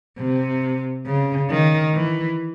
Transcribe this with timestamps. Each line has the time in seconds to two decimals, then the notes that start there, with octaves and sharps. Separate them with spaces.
0.18 C3
1.06 C#3
1.50 D#3
1.94 E3